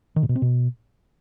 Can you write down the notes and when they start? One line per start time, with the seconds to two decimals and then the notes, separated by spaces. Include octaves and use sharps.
0.16 D#3
0.23 A#2
0.29 B2
0.35 C4
0.42 B2